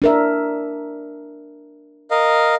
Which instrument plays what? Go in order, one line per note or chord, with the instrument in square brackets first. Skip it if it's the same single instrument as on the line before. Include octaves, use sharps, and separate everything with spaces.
[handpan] D4 A#4 E5
[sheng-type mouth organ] A#4 D#5 F5